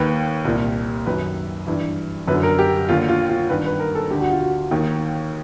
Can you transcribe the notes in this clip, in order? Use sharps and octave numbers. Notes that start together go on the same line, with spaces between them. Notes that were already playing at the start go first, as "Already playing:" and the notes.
Already playing: D#2 D#3 B4
C2 A#2
F#2 D#3 B4
G2 E3
F#2 D3 B4
A#4
G4
D#2 D3 F4
F4
F4
G2 D#3 B4
B4
A#4
A4
D2 D3 G4
F#4
F4
F#4
D#2 D#3